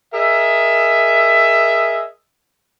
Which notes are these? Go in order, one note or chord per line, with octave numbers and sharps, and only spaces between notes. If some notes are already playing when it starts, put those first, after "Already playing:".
G#4 A#4 D#5 E5